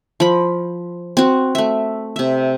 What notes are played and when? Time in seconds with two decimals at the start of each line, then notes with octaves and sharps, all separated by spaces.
0.20 F3 B5
1.17 C4 F#4
1.55 A3 E5
2.16 C3 E5